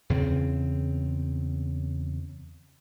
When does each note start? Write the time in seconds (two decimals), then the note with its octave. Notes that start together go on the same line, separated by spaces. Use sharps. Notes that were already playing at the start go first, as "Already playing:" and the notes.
0.10 E2 C#3 C4